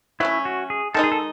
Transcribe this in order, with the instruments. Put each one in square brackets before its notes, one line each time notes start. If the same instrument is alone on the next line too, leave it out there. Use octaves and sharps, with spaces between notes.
[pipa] F#3 A3 C#4 [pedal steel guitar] E4
[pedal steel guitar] F#4
G#4
[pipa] D#3 G#3 D#4 [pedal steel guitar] A4
[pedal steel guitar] G#4
A4